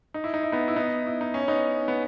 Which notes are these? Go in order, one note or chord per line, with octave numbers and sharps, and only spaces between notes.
D#4
E4
D#4
E4
B3 D#4
E4
B3 D#4
E4
D#4
C#4
B3 D#4
B3